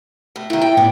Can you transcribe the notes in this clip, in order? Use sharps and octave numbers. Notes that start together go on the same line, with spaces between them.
A2
D#3 A3 E4
E4 G5
A2 B3 D4